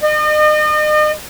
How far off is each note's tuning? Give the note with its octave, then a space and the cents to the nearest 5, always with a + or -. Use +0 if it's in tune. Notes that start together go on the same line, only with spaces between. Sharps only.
D#5 -40